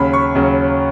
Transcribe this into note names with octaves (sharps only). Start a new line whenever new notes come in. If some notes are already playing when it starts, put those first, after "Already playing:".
Already playing: D#2 C#3 F#3 C#4 B5
C#6
D#2 C#3 F#3 C#4